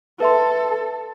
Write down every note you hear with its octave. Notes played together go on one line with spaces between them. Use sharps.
A4 B4 E5 C6